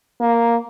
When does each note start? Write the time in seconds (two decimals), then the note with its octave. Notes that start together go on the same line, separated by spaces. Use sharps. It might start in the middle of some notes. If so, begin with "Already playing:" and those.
0.21 A#3